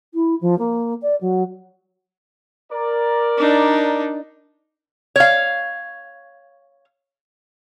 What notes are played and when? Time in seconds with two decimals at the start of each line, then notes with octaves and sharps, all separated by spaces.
0.14 E4
0.41 F3
0.58 A#3
1.02 D5
1.21 F#3
2.71 A#4 D5
3.38 D4 D#4
5.16 C#5 F5